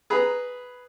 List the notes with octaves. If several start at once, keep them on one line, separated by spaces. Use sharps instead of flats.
G#4 B4 A#5